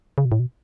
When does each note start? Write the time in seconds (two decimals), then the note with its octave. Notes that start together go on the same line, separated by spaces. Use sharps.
0.18 C#3
0.25 B2
0.32 A2
0.40 B2